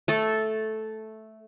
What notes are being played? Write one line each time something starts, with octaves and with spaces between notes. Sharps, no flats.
A3 A4